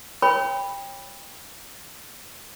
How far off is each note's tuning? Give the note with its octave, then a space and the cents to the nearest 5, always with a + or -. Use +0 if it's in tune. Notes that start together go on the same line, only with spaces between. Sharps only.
C#5 -20 G5 +20 B5 +0